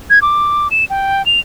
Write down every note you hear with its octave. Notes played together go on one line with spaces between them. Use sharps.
G#6
D6
E7
G5
F7